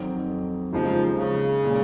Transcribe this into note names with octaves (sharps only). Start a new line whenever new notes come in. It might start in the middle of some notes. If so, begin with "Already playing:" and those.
Already playing: F2 D#3 F#3 C4
D#2 C#3 F3 G#3 D#4
C#3
A#2 G#3